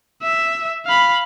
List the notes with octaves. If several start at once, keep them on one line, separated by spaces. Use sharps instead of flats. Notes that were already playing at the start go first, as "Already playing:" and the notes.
E5
F5 B5